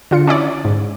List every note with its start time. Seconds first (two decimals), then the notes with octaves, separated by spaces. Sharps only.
0.11 D3 F4 C#7
0.27 C#4 D4 E4 C#5 D5
0.65 G#2